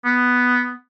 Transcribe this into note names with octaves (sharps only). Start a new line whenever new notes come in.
B3